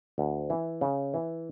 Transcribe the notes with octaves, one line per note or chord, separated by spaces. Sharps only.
D2
E3
C#3
E3